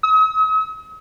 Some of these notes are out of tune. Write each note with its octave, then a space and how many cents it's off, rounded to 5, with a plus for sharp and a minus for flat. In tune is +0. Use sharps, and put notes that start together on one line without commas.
D#6 +45